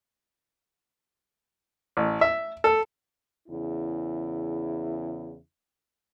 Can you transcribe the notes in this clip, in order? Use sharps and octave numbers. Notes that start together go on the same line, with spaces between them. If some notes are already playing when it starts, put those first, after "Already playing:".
A1
E5
A4
E2 C#3 E4